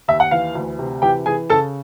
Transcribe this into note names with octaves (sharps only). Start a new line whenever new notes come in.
D#2 E5
F#5
E3 F5
D2
C3
E3 G4 G5
E3 G#4 G#5
C#3 A4 A5